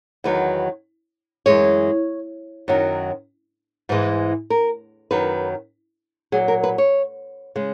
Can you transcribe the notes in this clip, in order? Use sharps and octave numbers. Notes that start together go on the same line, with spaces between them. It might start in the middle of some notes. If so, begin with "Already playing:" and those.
E2 D#3 F#3 B4
F#2 E3 G#3 C#5
F#2 D#3 F#3
G#2 E3 G#3 B4
A#4
F#2 D#3 F#3 B4
A#2 F#3 G#4
A#4
B4
C#5
C#3 G#3